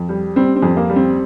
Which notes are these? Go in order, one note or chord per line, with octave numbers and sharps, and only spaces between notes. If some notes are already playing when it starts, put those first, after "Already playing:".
Already playing: F2
G3
G3 C4
C4
F2
A#3
G3
C4